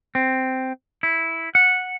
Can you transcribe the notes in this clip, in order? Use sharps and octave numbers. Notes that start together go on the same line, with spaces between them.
C4
E4
F#5